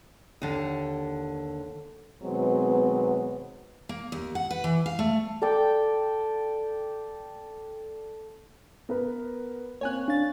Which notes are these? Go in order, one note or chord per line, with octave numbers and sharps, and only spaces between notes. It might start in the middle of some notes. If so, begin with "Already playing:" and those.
D#2 D3
B2 D#3 F#3 G#3 B3 C4
A#3
D#2
F#5
B4
E3
F5
A3
A4 D5 G5
B3 A#4 B4
A#3 C4 C#5 G#5 F#6
D4 F5 A6